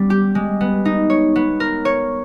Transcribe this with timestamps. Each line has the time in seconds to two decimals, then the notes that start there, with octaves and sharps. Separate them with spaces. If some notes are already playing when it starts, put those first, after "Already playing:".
Already playing: G3 B3 C#4
0.10 G4
0.35 G#3
0.61 B3
0.85 D#4
1.10 C#5
1.36 B3
1.60 A#4
1.85 C#5